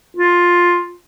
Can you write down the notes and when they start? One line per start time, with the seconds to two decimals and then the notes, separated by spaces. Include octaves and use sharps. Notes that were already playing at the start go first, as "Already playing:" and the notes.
0.17 F4